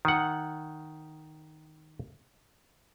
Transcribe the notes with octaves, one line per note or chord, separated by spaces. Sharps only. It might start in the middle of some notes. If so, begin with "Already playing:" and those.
D#3 F#5